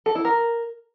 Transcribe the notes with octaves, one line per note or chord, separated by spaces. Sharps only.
A4
E4
A#4